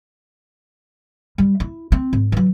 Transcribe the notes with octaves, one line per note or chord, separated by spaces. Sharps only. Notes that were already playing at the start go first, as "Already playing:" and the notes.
G3
E4
C4
G#2
E3 F#3